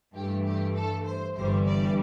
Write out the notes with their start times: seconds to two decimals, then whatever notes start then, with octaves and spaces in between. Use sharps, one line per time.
0.14 G2 E3 A3 G4
0.44 G4
0.74 A4
1.05 C5
1.35 G1 G2 E3 G3 C5
1.66 D5